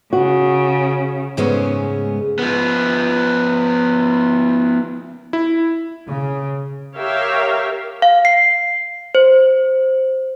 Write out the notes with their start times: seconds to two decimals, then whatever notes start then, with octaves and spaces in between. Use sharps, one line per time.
0.13 C#3 F#4
1.37 G#2 C#3 G#3 A3 B3 C#4
2.39 F3 B3
5.33 E4
6.07 C#3
6.96 G4 A#4 C#5 E5 F5 G5
8.02 F5
8.25 C7
9.15 C5